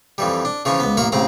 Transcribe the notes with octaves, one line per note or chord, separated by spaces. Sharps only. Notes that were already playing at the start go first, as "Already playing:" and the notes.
F2 E3 G3
D4
C#3 E3 F3 C#4
C#2 B3
A1 A#3 A#4 B5 C#6
A1 C#3 C4 A#5